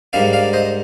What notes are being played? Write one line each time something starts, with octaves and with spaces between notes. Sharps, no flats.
G#2 G3 A#3 D4 D5 F5
D5 F5
C5 D#5